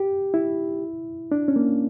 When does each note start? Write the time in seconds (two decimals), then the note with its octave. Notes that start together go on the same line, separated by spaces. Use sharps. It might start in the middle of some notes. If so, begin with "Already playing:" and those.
Already playing: G4
0.34 E4
1.32 D4
1.48 C#4
1.56 A#3